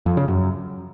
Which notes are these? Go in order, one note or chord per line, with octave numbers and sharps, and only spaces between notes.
F2
C#3
F#2